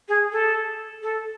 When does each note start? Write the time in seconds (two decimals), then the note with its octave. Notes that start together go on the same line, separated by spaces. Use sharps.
0.08 G#4
0.32 A4
1.02 A4